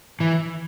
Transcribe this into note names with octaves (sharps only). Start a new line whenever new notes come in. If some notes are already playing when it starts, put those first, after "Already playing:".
E3